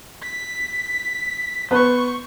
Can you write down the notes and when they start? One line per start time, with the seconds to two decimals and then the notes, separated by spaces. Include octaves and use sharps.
0.23 B6
1.71 B3 B4 C5 C#6